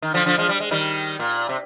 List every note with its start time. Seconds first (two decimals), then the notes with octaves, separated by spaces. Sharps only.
0.02 D#3
0.14 D3 F3
0.26 D3 F3
0.38 F3 G#3
0.49 G3
0.60 G#3
0.71 D#3 G3
1.19 A#2
1.49 C3